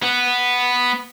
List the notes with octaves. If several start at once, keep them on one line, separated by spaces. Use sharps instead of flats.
B3